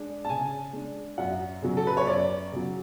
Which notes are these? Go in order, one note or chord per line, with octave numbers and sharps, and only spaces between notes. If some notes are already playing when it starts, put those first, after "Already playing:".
Already playing: G#3 D4
A5
C#3 G#5
G#3 D4
F#2 F#5
C#3 F#3
A4
B4
C#5
F#2 D5
C#3 F#3